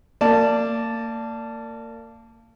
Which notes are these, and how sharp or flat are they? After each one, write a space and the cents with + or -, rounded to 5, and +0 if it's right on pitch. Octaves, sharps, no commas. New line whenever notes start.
A#3 -30 D5 -5 A5 +0